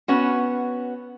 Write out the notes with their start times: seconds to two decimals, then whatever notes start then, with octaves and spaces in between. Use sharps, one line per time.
0.08 B3 C#4 F#4